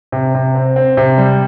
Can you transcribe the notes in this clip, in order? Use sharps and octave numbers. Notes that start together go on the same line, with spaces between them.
C3
C3
C4
C4
C3
G3